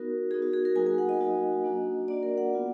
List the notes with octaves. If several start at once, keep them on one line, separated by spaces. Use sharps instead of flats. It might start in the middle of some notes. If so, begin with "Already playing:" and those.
Already playing: B3 D#4 F#4 A#4
B3 D#4 F#4 G#4
F#4
G#4
A#4
F#3 A#3 D#4 F#4 G#5
G#5
F#5
D#5
F#3 A#3 D#4 F#4
A#3 D4 F#4
A#3 D4 F#4 D5
A#4
F#5
B3 F4